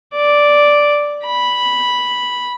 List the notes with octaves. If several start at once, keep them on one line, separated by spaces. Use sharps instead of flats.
D5
B5